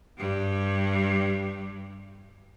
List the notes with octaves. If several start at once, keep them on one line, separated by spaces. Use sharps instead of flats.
G2 G3